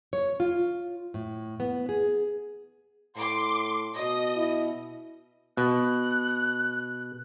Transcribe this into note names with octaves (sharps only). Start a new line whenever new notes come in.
C#5
F4
A2
B3
G#4
A2 C6 D6
B2 D#5
E4
B2 F#6